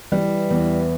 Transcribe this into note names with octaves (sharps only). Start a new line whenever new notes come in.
E3 G3
E2 E3